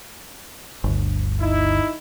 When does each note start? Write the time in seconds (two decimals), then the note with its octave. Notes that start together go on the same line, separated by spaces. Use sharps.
0.84 G1 D2
1.41 D#4 E4